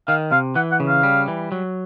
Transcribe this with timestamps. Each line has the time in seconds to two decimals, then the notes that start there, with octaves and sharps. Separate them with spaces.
0.08 D#3 F5
0.32 C3 F5
0.55 E3 F#5
0.72 F#5
0.80 C#3
0.89 F5
1.03 G3
1.28 E3
1.52 F#3